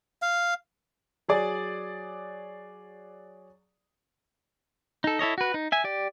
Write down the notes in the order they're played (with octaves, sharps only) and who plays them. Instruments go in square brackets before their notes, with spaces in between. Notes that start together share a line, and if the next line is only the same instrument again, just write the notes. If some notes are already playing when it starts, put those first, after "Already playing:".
[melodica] F5
[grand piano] F#3 G#4 D5
[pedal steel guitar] D#4 A4
E4 A4 C#5 D#5
F#4 B4
D#4
E5 G#5
G4 D5